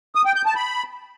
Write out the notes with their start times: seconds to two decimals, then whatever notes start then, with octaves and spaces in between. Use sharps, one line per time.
0.15 D#6
0.25 G5
0.36 G6
0.46 A5
0.56 B5